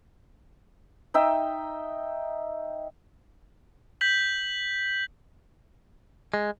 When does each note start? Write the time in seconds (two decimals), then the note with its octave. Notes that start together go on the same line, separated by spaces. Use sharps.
1.14 D#4 E5 G5
4.01 G6 B6 F#7
6.34 G#3